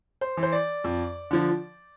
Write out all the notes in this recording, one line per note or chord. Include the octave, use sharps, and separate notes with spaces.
C5
E3
C5
D5
F2
D3 F3